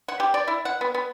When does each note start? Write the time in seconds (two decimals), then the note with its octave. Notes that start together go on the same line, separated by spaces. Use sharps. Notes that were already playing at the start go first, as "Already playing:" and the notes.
0.08 F#5
0.20 G4
0.34 D5
0.48 E4
0.65 F#5
0.81 B3
0.94 B3